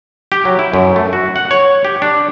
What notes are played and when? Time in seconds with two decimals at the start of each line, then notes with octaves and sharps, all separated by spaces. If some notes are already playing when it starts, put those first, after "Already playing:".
0.32 G4
0.45 F#3
0.59 E4
0.73 F#2
0.96 A3
1.13 F#4
1.36 F#5
1.51 C#5
1.85 G4
2.02 D4